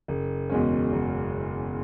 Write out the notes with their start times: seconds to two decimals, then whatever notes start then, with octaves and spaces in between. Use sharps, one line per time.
0.08 F#1
0.50 E2 B2 G#3 C#4
0.93 F#1